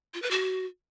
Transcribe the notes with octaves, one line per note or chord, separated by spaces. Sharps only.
F4
B4
F#4